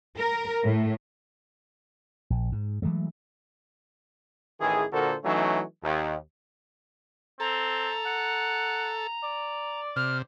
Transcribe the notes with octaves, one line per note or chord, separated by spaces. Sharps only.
A#4
A2
A#1
G#2
E3 F#3 G#3 A3
A1 D#3 E3 G#4
A#2 D3 F#4 A4 A#4 C5
E3 F#3 A3 C#4 D#4
D#2
C4 A4 A#5
F#5
D5
C3 F6